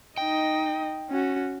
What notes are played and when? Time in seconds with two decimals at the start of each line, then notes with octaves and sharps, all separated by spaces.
0.18 D#4 D#5 G5
1.10 C#4 F#4